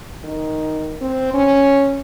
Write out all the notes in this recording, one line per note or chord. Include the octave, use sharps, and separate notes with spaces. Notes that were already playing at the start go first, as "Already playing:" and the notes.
D#3
C4
C#4